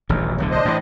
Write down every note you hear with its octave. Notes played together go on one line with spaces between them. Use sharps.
D#1 A1 D2
D1 B1 D3
D4 C5 D#5
A2 E3